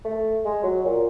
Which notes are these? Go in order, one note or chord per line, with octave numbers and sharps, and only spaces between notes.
A3
G#3
F#3
A#2